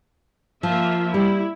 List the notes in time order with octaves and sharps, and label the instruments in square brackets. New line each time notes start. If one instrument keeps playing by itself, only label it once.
[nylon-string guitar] F3 [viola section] A#3 F4 E5
[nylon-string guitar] G3 [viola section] E4